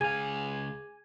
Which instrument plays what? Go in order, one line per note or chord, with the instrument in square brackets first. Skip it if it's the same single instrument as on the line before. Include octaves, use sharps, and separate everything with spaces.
[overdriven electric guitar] C#2 F5 [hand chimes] G#4 [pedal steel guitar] G#5